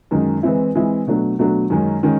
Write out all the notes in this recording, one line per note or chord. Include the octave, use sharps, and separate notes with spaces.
F#2 D#3 G#3
E3 G#3 C4 E4
E3 G#3 C4 E4
B2 F#3 A3 D4
B2 F#3 A3 D4
F#2 D#3 G#3 C#4
D#3 G#3 C#4